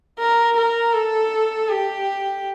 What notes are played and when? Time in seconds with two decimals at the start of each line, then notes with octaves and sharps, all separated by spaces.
0.19 A#4
0.57 A#4
0.94 A4
1.69 G4